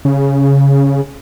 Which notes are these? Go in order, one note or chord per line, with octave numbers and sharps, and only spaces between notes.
C#3